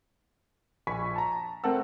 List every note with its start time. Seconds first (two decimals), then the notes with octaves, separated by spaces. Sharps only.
0.87 A#1 G#5 B5 C#6 B6
1.16 A5 A#5
1.64 A3 C4 A#4 F#5 A5 E6